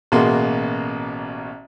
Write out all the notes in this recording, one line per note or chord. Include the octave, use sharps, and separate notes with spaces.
A1 B2 A#3 F#4 G#4 C6